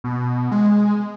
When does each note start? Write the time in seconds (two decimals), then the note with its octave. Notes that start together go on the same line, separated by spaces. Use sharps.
0.04 B2
0.51 G#3